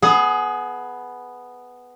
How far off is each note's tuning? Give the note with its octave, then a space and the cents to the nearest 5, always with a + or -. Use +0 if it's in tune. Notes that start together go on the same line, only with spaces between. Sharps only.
B3 +5 G#4 +25